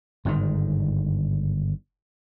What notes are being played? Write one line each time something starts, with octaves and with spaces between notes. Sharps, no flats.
G1 G#2 C3 D#3